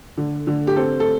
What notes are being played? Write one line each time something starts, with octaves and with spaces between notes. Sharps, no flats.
D3
D3
G4
C4 A4
A4